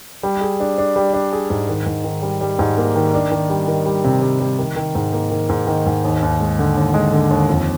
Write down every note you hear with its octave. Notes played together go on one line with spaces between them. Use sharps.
G3
G#4
D4
D4
G3
D4
G#4
G#2
D#3
G#2
D#3
G3
G3
G#2
A#3
D#3
D4
D#3
G3
D#3
G3
C3
G3
G3
D#3
D#3
G#2
A#3
D#3
G#2
D#3
G#2
D#2
D#2
G#3
D3
D#2
G#3
D3
D#2
F2